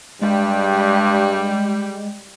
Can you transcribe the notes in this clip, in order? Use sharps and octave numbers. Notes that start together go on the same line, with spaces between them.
G2 G3 G#3 G4